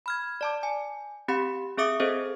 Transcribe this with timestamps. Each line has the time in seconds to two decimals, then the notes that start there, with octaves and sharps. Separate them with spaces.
0.06 B5 F6 G#6
0.41 D5 A5 D6
0.63 G#5
1.28 C4 G4 F#5 B5
1.78 C4 G#4 E5 D6 D#6 C#7
2.00 C4 G#4 A4 C5 D#5